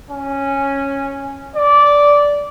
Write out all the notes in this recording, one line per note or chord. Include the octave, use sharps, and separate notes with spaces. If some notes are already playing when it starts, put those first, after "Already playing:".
C#4
D5